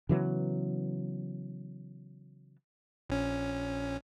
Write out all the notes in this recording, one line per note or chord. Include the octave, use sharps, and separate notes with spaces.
C#3 E3 F#3 B3
A#1 C#4